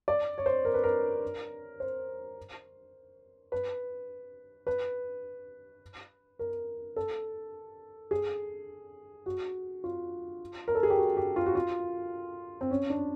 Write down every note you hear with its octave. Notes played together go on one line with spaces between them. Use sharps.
D5
C#5
C5
A#4
B4
A#4
C5
B4
B4
A#4
A4
G#4
F#4
F4
A#4
A4
G#4
G4
F#4
G4
F4
F#4
F4
C4
C#4
D4